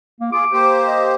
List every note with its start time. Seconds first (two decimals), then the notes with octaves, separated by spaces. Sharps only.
0.20 A#3
0.32 F4 G#4 D6
0.52 A#3 G4 C5
0.86 D#5